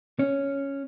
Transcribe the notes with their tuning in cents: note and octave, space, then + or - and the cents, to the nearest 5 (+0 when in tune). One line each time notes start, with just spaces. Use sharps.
C#4 +0 C#5 +0